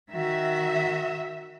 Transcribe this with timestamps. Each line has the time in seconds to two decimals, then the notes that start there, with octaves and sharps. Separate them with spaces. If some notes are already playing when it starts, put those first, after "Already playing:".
0.11 D#3 F#4 E5